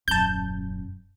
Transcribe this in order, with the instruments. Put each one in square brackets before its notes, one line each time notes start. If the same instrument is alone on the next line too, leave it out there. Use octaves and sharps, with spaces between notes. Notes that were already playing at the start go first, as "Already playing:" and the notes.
[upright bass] D#1 F#2 [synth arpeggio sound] A5 G6